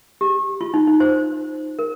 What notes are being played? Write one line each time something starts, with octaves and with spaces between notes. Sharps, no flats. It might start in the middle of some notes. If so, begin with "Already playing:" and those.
G4
F4
D#4
D#4
C5
A#4